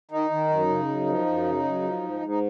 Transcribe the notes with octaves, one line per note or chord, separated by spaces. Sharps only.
D#3 D#4
D#3
F#2
C#3
F#2
F3
F#2
C#3
F#2
F3
G#2
G#2
D#4